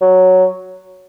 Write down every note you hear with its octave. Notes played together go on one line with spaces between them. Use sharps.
F#3